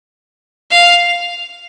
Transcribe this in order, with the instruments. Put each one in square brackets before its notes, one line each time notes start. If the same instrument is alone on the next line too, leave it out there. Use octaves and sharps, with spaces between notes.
[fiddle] F5